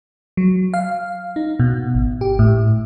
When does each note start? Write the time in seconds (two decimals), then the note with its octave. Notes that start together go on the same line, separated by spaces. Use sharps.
0.37 F#3
0.74 F5
1.36 D#4
1.59 B2
1.94 G#1
2.21 G4
2.39 A2